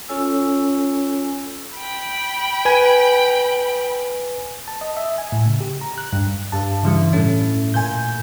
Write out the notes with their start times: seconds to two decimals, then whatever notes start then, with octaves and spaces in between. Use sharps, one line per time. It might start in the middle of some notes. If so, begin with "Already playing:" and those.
0.09 C#4 F4 A4 C#5 G#5 E6
1.77 G5 B5
2.65 B4 G#5
4.68 A5
4.81 D#5
4.97 E5
5.18 G#5
5.32 A2
5.46 C#3
5.61 G4
5.81 A#5
5.98 F#6
6.13 G2
6.52 G2 A5 E6
6.83 C#3 E3 G3 E5 E6 C#7
7.13 A2 A3 C#4
7.74 A#2 G#5 G6